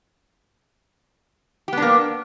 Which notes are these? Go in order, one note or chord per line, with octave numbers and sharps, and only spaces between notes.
A#3 B3 D4 G4